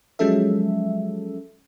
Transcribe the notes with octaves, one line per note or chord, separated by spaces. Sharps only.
F3 F#3 G#3 C#4 A4 E5